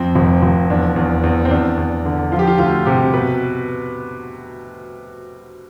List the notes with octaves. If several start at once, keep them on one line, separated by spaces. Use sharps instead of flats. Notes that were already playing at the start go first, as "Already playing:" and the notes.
Already playing: F2 C4
F1
F1
E2 D4
E2
E2
C4
E2 D4
E2
D3
F3 F4
G4
F4
D2 F4
C3 G4
B2 B4